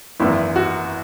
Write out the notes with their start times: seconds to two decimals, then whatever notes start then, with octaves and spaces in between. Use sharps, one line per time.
0.20 G#1 F#2 E3 E4
0.56 F#4